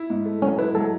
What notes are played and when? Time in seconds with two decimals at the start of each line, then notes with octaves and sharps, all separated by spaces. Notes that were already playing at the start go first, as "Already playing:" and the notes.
Already playing: E4
0.10 G#2
0.25 A3
0.42 F#3 C#4
0.59 E4 B4
0.75 F#3 A4